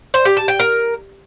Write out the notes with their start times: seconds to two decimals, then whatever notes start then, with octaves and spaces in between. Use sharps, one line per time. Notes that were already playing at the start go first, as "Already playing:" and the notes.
0.14 C5
0.25 G4
0.37 A5
0.48 G5
0.59 A#4